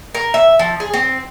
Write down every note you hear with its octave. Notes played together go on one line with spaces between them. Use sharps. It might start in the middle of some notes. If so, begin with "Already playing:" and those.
A#4
E5
F3
G#4
C4